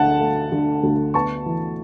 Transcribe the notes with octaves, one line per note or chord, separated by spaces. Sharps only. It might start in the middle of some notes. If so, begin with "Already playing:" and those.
Already playing: D2 D3 F#5 A5
A3
D3
D2
B3 A5 C#6
E3